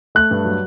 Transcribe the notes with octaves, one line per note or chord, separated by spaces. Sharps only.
A3 F#6
G2
F#3